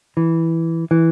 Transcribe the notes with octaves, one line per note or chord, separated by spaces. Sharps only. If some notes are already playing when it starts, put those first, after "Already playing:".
E3
E3